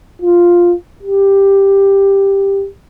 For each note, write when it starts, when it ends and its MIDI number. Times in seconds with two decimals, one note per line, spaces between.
0.22 0.74 65
1.03 2.66 67